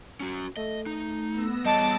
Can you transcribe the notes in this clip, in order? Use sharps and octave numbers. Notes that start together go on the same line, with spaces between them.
C#4 F#4
A3 D#5
D#4
B3 E6 A#6
G3 G#4 C#5 D#5 A5 D6